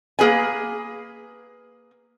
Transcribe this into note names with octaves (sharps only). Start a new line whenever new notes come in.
A#3 G#4 B4 G#5